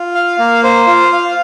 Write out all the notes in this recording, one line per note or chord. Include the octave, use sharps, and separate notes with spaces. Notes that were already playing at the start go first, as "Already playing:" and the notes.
Already playing: F4
F5
A#3
C5
F4
F5